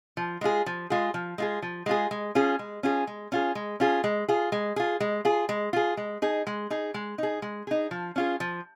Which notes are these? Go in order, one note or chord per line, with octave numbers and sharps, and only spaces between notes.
F3
G#3 F4 G#4
F3
G#3 F4 G#4
F3
G#3 F4 G#4
F3
G#3 F4 G#4
G#3
C#4 F4 G#4
G#3
C#4 F4 G#4
G#3
C#4 F4 G#4
G#3
C#4 F4 G#4
G#3
F4 G#4
G#3
F4 G#4
G#3
F4 G#4
G#3
F4 G#4
G#3
D#4 G#4
G#3
D#4 G#4
G#3
D#4 G#4
G#3
D#4 G#4
F3
C#4 F4 G#4
F3